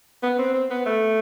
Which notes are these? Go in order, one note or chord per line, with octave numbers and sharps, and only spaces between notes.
B3
C4
C4
B3
A3